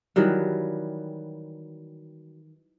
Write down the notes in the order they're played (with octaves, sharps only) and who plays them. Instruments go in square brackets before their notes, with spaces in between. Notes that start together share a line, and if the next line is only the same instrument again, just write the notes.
[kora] D#3 E3 F#3 G3